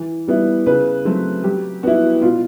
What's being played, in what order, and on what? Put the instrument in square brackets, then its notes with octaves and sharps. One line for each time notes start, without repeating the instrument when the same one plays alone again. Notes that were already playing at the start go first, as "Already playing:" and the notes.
Already playing: [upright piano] E3
G3 B3 E4
C#3 B4
F#3 A3 C4
F#3 G4
B3 E4 F#4
B2 F4